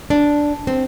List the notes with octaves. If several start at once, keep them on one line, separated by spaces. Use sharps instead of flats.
D4
C4